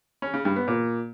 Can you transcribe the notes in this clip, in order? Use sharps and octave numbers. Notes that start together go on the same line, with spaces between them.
C#4
C#3
G2
B3
A#2